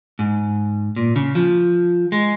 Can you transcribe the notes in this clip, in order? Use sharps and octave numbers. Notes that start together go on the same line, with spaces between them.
G#2
A#2
C#3
F3
G#3